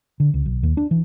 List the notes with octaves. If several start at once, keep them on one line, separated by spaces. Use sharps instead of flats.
D3
C#2
B1
D#2
D4
E3